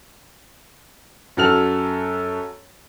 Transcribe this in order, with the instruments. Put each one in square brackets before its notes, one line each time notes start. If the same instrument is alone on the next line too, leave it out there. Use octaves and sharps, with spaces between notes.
[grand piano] F#2 F#4 A4 F6 F7